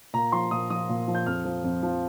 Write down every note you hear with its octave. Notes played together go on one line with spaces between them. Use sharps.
A#2 A#5
F3 C6
A#2 D#6
F3 D#6
A#2
F3
G6
F2 F6
F3
F2
F3